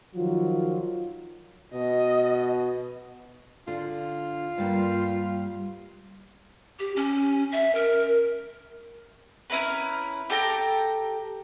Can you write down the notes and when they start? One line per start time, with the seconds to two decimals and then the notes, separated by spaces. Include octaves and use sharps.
0.16 D#3 F3 F#3 F4
1.73 B2 D#5
3.68 D3 F4
4.58 G2 G3 A#3
6.80 G4
6.96 C#4
7.52 E5
7.75 A#4
9.50 C#4 E4 A#4 B4
10.30 G4 A4 G5 A#5